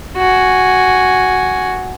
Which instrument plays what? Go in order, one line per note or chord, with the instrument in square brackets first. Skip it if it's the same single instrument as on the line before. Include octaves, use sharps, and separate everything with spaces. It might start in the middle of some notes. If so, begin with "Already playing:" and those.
[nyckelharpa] F#4 G#5